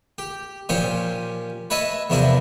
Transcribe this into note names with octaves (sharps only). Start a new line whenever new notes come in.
G4
A#2 F3 C#4 G4 C5
B4 C#5 D#5 E5 A5
E2 C3 F3 D4 E4 A#4